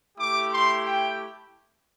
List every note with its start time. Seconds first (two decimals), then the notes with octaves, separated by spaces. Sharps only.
0.17 A3 E4 G4 D6
0.51 C6
0.84 G5